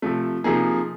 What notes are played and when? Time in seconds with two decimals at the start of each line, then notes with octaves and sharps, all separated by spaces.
0.02 C3 F3 A3
0.44 C3 F3 A#3 D#4 G#4